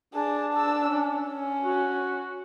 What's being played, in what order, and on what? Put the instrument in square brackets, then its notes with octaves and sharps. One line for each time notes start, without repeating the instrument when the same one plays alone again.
[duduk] D4 [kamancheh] G#4 A5
[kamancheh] A5 E6
C#4
C#4
[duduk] F#4